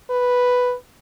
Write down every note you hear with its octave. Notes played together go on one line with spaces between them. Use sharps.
B4